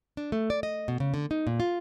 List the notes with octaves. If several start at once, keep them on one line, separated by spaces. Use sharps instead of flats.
D4
A3
D5
D#5
B2
C#3
D3
D#4
A#2
F4